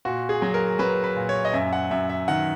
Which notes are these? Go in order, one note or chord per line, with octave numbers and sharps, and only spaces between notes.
A#2 F#4
G#4
F#3
A#4
F#3 B4
B4
A#2
C#5
D#5
F#2 E5
F#5
F#2 E5
E5
D#3 F#5